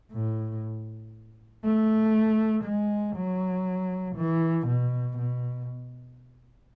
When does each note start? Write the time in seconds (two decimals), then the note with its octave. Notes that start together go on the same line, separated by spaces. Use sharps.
0.12 A2
1.64 A3
2.64 G#3
3.16 F#3
4.16 E3
4.68 B2
5.18 B2